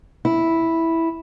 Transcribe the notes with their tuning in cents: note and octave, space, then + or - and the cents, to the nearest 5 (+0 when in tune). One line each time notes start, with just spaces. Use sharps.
E4 -5